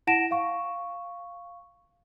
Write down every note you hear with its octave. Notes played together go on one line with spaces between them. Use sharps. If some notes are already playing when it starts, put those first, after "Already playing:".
E4 F#5 A5 A#6 D7 E7
F5 C#6